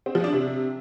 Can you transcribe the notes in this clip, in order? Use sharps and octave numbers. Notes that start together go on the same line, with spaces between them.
C4
F3
D4
C3